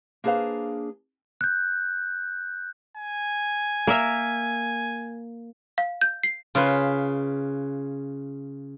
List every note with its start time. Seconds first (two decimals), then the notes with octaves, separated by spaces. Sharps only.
0.24 A#3 D4 G#4 B4 C5 F5
1.41 F#6 G6
2.97 G#5
3.87 A#3 A#4 E5
5.78 F5
6.01 G6
6.23 C7
6.55 C#3 F4 B4 C6